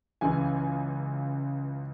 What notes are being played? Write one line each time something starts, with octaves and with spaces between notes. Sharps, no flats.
C#2 C#3 E3 G#5